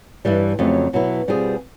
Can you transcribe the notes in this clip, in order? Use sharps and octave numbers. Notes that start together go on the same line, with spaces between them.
G2 E3 G3
F2 C#3 F#3 A3
B2 F#3 B3 E4
B2 G3 C4 F4 G#4